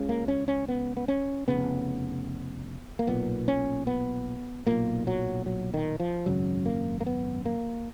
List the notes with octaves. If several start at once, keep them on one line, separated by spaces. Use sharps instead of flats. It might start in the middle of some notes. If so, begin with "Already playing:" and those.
Already playing: C#2 C#3
A#3
C#4
C#4
B3
B3
C#4
F1 D#2 C#3 B3
A#3
B1 A#2 B3
C#4
B3
B1 A#2 A#3
F#3
F#3
D#3
F3
G#1 F#2 C#3 F#3
A#3
A#3
B3
A#3